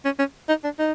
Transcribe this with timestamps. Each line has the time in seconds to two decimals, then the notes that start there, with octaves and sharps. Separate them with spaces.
0.05 C#4
0.19 C#4
0.48 D#4
0.64 D4
0.79 D#4